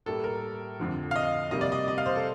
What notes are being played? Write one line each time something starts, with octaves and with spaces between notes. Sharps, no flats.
A2 G3 A#3 A4
A#4
F2 D3 F3
F5
D#5
C3 G3 A#3 D#5
D5
D#5
D#5
F5
C5
A4